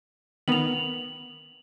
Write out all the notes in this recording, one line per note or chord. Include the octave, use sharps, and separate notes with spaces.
D#3 B3 F7 F#7